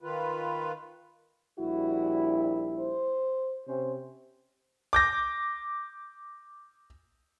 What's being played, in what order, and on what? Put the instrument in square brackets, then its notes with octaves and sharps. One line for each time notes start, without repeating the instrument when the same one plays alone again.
[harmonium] D#3 F4 B4
[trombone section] A#1 G3 E4 [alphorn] F#4
[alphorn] C5
[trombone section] C3 C#4 C5
[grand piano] D6 G6 A#6